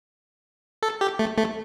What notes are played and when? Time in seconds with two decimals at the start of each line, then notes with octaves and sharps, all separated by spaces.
0.83 A4
1.01 G4
1.19 A3
1.38 A3